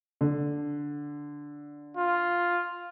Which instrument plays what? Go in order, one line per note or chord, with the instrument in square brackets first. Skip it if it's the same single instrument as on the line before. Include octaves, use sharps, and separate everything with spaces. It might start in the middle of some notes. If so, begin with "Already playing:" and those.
[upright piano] D3
[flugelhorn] F4